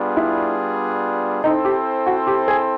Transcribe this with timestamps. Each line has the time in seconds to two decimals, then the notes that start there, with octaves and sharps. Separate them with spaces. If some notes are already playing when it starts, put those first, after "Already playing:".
Already playing: G3 B3 D4 F4 G#4
0.17 E4
1.43 C4 D#4 E4 A4 C5
1.65 G4
2.06 F#4
2.27 G4
2.48 G#4